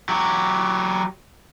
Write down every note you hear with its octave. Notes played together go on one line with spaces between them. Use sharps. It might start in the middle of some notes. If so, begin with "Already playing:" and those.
F#3 G4